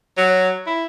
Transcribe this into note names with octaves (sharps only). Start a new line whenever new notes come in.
F#3
E4